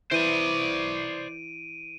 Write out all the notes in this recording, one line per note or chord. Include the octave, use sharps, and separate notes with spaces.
E3 C5 D5 D7 D#7